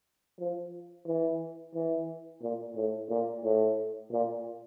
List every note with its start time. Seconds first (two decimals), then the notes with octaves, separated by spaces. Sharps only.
0.40 F3
1.07 E3
1.75 E3
2.42 A#2
2.76 A2
3.10 A#2
3.44 A2
4.11 A#2